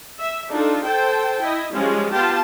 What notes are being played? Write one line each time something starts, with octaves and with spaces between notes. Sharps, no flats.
E5
D4 D#4 F4 A4
A4 C5 G5 A5
E4 D#5
F3 G3 G#3 C#4 F4
B3 F4 G4 G5 A5